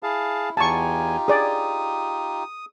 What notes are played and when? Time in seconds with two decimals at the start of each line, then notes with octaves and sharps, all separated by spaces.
0.03 E4 G#4 F5 A5
0.57 E2 D#4 F4 G4 G#5 A5 C#6
1.28 G#4 D5 D#6